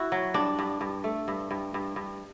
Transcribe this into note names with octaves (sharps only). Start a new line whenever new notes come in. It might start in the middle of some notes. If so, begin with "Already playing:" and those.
Already playing: E4 F#4
F#3
G2 D4
G2
G2
A3
G2
G2
G2
G2